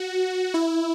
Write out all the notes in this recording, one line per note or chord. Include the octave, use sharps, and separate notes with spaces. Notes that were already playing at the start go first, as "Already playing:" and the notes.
Already playing: F#4
E4